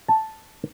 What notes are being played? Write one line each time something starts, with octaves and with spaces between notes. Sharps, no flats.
A5